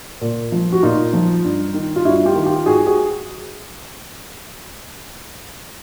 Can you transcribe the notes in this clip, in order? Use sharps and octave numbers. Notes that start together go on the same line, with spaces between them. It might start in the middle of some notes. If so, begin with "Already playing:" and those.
A#2
F3
F#4
A#2 D#4 F4
F3
G2
D#3
F4
G2 E4 F#4
F4 G4
D#3
F4 G4
G#2 F#4 G#4
F#4 G#4